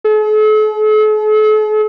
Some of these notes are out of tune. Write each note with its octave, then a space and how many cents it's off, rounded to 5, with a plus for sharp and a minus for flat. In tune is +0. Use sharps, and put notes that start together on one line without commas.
A4 -45